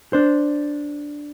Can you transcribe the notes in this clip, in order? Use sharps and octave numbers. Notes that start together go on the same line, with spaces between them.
D4 C5